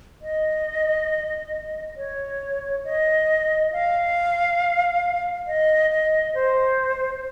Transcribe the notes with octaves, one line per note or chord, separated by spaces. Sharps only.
D#5
C#5
D#5
F5
D#5
D#5
C5